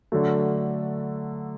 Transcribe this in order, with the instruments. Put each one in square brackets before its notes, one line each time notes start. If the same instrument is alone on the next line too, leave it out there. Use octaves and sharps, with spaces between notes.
[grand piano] D3 F#3 A3